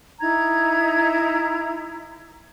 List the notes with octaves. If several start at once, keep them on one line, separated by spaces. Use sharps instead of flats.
D#4 E4 A#5 G#6